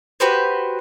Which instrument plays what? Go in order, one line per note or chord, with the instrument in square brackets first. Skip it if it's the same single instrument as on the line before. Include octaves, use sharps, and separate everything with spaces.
[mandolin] F#4 G4 B4 C5